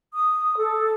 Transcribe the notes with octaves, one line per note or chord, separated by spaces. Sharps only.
D#6
A4